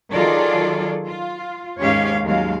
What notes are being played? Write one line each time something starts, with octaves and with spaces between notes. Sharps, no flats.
D#3 F#3 F4 G#4 A4 D5
F4
D#2 G#2 C#4 G4 C#5 F5
D#2 F#3 G#3 F5